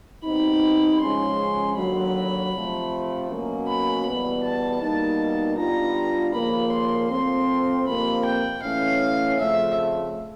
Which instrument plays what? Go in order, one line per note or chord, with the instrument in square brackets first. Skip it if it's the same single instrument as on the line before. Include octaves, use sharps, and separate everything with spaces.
[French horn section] B2 G3 C4 D#4 [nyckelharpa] B5
[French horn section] C#3 F3 G#3 C#4 [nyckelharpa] C6
[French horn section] D#2 D3 F#3 [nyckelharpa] B5
[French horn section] C3 F3 A3
B2 F#3 A#3 C#4 F#4
[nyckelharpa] B5
[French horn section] E2 B2 G3 B3 [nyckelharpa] B5
[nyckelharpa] A5
[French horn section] B2 G3 A#3 D#4 [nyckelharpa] A5
[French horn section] B2 G3 B3 D4 F4 [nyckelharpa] A#5
[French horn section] D#2 C#3 F3 A#3 [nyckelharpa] B5
[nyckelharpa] C6
[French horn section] F3 A3 C4 [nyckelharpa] C6
[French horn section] F2 C3 F3 A#3 [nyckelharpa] B5
[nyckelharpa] G5
[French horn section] A2 E3 A3 C#4 [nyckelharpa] F5
[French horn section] F2 C#3 F3 A3 [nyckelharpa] E5